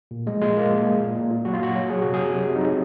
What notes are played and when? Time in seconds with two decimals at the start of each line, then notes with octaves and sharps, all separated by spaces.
0.11 A#2
0.26 F3 G#3
0.41 A#2 G#3
0.56 A#2 A#3
0.71 A#2
0.86 A#2
1.00 A#2
1.16 A#2
1.30 A#2
1.45 F#3 F#4
1.54 F4
1.59 A#2 F#4
1.75 F#3
1.89 F#3 G#4
2.02 C3 F#4
2.14 G#4
2.19 F#3
2.34 C3
2.48 C3
2.56 D#4
2.64 F#3